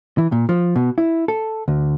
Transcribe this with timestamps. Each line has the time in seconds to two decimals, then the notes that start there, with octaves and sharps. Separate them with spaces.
0.18 E3
0.32 A#2
0.49 F3
0.76 B2
0.98 E4
1.28 A4
1.68 D2